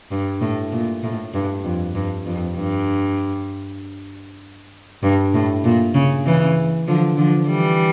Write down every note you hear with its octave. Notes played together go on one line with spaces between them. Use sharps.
G2
A2
A#2
A2
G2
F2
G2
F2
G2
G2
A2
A#2
C#3
C#3 E3
D3 F3
D3 F3
E3 G3